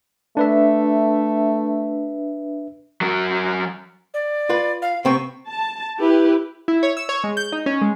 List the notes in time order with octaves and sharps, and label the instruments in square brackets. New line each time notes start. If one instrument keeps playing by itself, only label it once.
[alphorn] A3 [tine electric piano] D4 B4 E5
[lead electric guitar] F#3 A#4
[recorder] D5
[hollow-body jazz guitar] F4 B4
[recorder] F5
[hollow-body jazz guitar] C3 B3 C4 [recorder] C#6
[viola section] A5
E4 G4 B4
[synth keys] E4
C#5
E6
C#5
G#3
G6
D#4
C#4
G#3